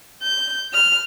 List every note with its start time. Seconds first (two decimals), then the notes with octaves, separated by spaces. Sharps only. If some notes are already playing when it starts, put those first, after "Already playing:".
0.22 G6
0.72 F6